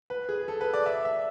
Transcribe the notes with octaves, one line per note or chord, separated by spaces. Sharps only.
B4
G#4
A4
B4
D5
E5
E5